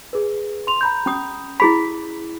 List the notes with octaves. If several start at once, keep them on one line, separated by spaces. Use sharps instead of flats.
G#4 B4
C6 F7
A#5 B5 G6
C#4 D#6
E4 G#4 B5 B6